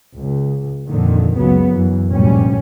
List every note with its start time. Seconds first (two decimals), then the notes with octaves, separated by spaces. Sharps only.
0.16 C#2
0.88 F2 A#2 D3 D#3
1.37 F#1 C#2 C#3 F#3 B3
1.71 F#2 E3
2.09 F1 D2 G2 A#2 G3 C#4